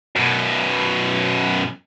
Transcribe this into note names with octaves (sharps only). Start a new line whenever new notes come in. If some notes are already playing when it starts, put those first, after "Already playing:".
F#2 B2